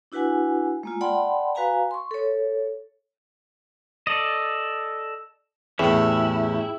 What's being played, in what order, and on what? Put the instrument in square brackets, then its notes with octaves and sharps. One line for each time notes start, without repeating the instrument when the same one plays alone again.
[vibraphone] D4 E4 F#4 B4 F#5 G#5
G#3 A#3 F4
D5 F#5 G5 A5 B5 C6
F#4 B4 F5 G#5 A#5
C6 C#6
A4 C#5
[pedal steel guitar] A4 D5 D#5
[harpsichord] E2 A2 [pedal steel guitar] C#4 G4 [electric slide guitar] E4 [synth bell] G#4 G5 E6